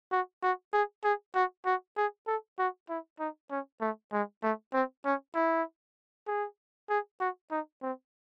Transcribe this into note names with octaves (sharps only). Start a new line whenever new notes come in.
F#4
F#4
G#4
G#4
F#4
F#4
G#4
A4
F#4
E4
D#4
C#4
A3
G#3
A3
C4
C#4
E4
G#4
G#4
F#4
D#4
C4